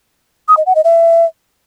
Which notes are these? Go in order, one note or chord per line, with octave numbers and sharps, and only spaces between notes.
D#6
D#5
F#5
D#5
E5